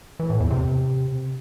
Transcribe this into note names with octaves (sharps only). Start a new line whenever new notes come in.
E3
A2
E2
C3